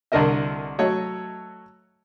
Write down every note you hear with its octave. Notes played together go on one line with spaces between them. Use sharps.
C2 D3 D4 A#4 D#5 E5
F#3 A3 C#5 D#5